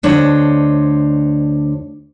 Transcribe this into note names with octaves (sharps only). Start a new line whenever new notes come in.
D2 D4 C5 C#5 D#5